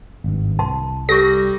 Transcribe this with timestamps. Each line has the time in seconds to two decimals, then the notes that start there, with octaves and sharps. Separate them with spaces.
0.24 G#1 G2
0.59 C2 A5 C6
1.09 G3 A4 C#6 A#6